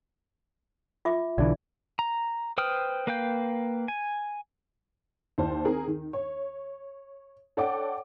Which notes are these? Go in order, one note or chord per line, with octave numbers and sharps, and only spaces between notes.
F4 E5 D6
B1 D3 E3 D5
A#5
B4 C5 G5 D#6 F6
A#3 B4 F5 G5 G6
G#5
D#2 E4 C5 D5 A5
D#3 C4 G#4 A#4
D#3
C#5
A4 C#5 D5 F#5 G5 D6